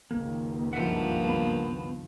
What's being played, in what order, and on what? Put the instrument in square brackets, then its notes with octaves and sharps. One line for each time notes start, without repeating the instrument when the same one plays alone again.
[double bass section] F#1 C#2 D#3 [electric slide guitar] A#3
[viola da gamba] G2 F3 [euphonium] A#3 [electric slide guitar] E5 F#5
[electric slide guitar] B3